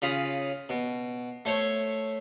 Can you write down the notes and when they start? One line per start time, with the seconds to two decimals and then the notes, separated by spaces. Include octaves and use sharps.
0.02 C#3 F4 B5 D#6
0.69 B2
1.45 A3 C5 C#5